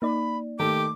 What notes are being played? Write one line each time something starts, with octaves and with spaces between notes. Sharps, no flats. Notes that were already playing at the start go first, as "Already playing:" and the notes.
A#3 D#4 D5 B5
D#3 A3 G4 D6